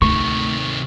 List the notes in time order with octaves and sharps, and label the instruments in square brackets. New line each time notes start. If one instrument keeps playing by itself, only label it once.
[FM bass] D2 [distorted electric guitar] C3 D#3 [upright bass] A3 [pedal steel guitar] C#6